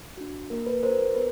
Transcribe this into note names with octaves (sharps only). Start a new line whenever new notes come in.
D4 F#4
A#3 A#4
B4
D4 F#4 A#4 C5
A#4
B3 B4